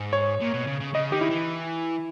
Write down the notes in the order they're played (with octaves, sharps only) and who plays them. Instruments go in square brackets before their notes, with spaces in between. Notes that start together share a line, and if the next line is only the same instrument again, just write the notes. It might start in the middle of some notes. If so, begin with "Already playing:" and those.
Already playing: [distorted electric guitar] G#2
[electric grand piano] C#5
[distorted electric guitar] A#2
B2
C#3
C#3
[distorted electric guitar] C#3 [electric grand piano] D#5
[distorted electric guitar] D#3 [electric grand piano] G4
[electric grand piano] E4
[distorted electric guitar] E3